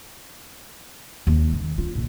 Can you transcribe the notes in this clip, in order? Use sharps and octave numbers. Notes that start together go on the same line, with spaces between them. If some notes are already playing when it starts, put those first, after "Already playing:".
D#2
D#3
F4
A#1